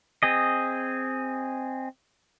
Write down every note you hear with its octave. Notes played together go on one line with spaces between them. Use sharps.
C4 G#4 D#5